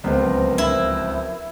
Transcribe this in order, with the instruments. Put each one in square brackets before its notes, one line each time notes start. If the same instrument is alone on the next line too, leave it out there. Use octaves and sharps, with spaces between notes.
[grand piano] D1 C#2 C4 [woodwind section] F3 A#4 [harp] B3
[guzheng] E4